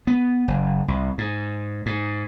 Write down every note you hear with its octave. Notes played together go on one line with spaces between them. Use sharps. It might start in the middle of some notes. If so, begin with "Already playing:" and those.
B3
F#1
C2
G#2
G#2